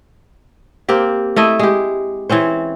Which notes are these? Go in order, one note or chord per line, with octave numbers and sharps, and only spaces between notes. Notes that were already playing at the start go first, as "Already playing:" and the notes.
A#3 C4 G4
A3 E4 D#5
G#3 G4
E3 C4 C#4 C5